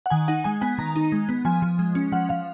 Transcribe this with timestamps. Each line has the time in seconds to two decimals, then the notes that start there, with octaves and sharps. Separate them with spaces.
0.06 F#5
0.10 D#3 G#5
0.28 D#4 F#5
0.44 G#3 G#5
0.61 B3 G#5
0.78 D#3 A#5
0.96 D#4
1.12 G#3
1.29 B3
1.45 F3 G#5
1.62 F3
1.79 G#3
1.95 C#4
2.12 F3 F#5
2.29 F3 F5